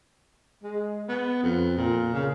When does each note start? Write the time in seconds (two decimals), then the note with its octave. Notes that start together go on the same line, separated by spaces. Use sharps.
0.63 G#3
1.09 B3
1.43 F2
1.78 A#2
2.14 C#3